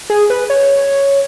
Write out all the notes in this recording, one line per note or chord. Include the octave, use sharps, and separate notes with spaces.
G#4
B4
C#5